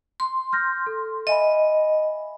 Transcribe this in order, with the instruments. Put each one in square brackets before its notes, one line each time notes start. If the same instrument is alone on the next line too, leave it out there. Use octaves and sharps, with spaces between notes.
[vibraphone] C6
[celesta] F6 G6 A#6
A4
[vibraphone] D#5 [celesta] E5 G#5 B5